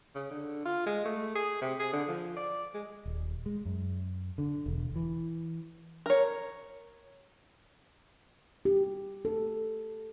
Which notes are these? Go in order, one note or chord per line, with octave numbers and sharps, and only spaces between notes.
C#3
D3
F4
G#3
A3
G#4
C3
G#4
D3
F3
D5
G#3
D#1
G#3
F#2
D3
E1
E3
A#4 C#5
G4
A4